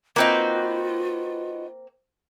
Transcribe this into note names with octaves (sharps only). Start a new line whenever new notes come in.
A#3 C4 D#4 F4 F#4 B4